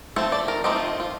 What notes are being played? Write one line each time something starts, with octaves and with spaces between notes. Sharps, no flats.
F3 A3 C4 A4
D5
A#4
F3 A3 C4 D#4 G4
F4
D#4
F4